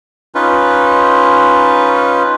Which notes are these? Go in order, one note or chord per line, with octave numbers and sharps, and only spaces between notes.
C#4 D#4 F4 B4